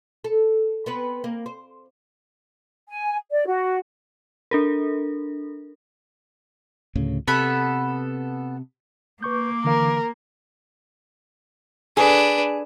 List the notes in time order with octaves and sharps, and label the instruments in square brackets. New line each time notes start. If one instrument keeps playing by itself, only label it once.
[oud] A4
B3 C4 B4
A#3
C5
[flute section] G#5
D5
F#4
[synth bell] D4 A4 A#4
[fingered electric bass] D2 A2 C#3
[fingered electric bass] C3 [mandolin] B3 A4 B5
[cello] A#3 [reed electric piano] B4 C#6 G6 [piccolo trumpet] D6
[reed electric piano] D3 E3 F5 [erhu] A#4
[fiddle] D4 B4 [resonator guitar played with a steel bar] G#4